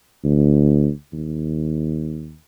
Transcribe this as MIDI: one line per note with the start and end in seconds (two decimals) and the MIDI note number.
0.25 0.90 38
1.13 2.36 39